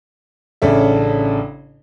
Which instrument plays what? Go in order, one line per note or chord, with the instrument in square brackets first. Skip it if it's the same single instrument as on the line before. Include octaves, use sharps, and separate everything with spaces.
[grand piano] A1 C#3 D4 A4 E5